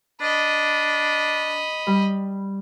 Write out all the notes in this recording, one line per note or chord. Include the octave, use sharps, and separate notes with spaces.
D4 D#5 B5
G3